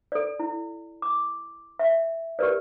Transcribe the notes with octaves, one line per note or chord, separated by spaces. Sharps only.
A4 D5
E4
D6
E5
G4 A#4 B4 D5